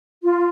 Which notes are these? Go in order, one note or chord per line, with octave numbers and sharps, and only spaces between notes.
F4